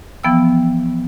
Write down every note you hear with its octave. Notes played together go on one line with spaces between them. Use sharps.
E3 F3 B3 G5 E6